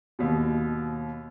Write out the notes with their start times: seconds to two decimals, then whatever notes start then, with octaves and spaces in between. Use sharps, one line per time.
0.19 D#2 B2